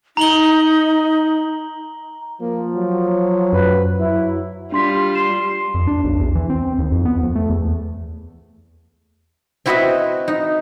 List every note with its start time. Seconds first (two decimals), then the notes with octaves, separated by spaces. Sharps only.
0.17 D#4 A#5 F#7 G7
2.41 F3 A#3
2.75 F#3
3.53 F#2 F3 B4
3.99 F#3 E4
4.72 G3 D4 F4 C6 B6
5.15 C6 E7
5.74 F2
5.87 D4
6.04 B1
6.19 E2
6.35 E3
6.50 C4
6.79 D#2
6.92 F2
7.05 B3
7.23 F2
7.36 A3
7.50 E2
9.66 C4 E4 F#4 B4 D#5 E5
10.28 D#4